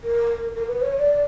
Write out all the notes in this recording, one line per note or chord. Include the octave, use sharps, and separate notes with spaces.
A#4
A#4
B4
C#5
D5